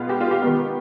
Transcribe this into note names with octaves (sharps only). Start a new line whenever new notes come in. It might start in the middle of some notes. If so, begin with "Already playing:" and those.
Already playing: B2 G#3 B3 F4
G4
F4
G4
D#3 B3